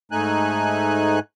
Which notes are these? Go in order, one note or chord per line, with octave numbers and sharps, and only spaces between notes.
G#2 A3 D#4 G#5 F#6